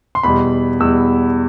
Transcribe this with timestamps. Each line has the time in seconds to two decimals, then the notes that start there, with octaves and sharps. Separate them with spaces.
0.15 C6
0.23 E2 B2 G3 B5
0.80 E2 B2 G3 E6